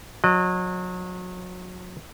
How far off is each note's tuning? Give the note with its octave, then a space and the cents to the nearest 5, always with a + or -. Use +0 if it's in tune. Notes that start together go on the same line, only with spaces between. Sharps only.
F#3 -30 D#5 -40